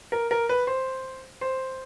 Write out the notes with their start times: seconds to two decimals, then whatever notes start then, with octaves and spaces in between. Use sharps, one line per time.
0.12 A#4
0.31 A#4
0.49 B4
0.67 C5
1.41 C5